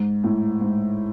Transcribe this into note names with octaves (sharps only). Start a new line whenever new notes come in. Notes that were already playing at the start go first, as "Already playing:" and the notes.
Already playing: G#2
A2
G#2